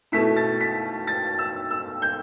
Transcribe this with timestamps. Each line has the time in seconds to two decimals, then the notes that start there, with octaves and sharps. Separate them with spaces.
0.12 B2 A3 E4 B6
0.36 A6
0.61 B6
1.07 A6
1.39 E6
1.71 E6
2.02 G6